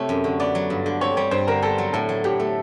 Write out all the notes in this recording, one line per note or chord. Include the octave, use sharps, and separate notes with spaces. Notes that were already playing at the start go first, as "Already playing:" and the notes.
Already playing: C3 A3 C4 C#5
F#2
D3
B3 D5
F#3
G2
D3
C4 C#5
G3 C#5
G2 C5
D3 A#4
B3 A4
F#3
A2 A4
F#3
A2 G4
A3